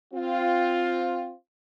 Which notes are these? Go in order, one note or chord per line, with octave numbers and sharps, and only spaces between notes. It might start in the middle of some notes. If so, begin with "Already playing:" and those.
C4 F4